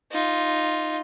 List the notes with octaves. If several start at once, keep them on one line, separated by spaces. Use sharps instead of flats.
D#4 F4